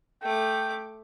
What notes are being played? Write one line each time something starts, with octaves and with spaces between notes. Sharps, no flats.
A3 G5 D6